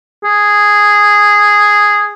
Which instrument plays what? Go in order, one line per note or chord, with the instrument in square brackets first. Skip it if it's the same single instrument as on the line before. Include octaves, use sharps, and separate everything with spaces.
[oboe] G#4